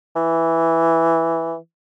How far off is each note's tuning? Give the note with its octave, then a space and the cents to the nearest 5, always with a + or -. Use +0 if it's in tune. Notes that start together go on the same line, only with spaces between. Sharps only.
E3 +0